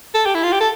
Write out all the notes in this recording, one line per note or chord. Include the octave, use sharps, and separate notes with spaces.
A4
G4
E4
F4
G4
A4